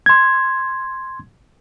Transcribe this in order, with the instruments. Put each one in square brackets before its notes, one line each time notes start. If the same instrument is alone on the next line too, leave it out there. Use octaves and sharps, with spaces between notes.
[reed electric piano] C6 G#6